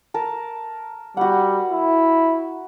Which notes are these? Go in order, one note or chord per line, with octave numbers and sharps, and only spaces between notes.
A#4 A5
G3 F#4 F#5
E4